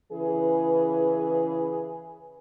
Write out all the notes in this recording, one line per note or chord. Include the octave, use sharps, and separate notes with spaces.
C#3 E3 G#4 B4